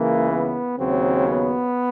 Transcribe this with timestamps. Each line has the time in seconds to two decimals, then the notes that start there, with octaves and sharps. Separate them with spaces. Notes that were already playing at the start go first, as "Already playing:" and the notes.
Already playing: C#2 C#3 E3 A#3
0.31 B3
0.78 D#2 C#3 F#3 C4
1.27 B3